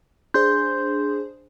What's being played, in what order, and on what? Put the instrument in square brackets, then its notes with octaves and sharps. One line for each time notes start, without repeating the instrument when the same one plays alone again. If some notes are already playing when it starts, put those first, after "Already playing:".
[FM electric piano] D4 G#4 C5 [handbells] C6 G6